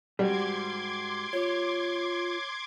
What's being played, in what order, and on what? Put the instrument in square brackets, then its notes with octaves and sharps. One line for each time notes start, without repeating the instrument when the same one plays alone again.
[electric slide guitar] G#2 F#4 [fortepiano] G3 [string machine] C6 D6 G#6
[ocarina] F4 [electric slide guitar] C#5